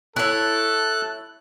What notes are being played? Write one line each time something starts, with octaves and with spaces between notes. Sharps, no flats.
E4 A4 C#5 F#6